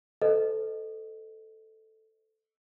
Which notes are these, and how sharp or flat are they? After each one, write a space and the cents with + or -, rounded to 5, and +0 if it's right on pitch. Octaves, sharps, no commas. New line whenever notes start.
A4 +0 C5 -40 D#5 +0